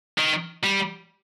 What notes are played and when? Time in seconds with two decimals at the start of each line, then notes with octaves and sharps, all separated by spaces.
0.18 D#3
0.63 G3